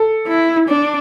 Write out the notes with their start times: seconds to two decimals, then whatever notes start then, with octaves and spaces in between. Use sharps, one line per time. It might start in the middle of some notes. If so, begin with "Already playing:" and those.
Already playing: A4
0.28 E4
0.69 D4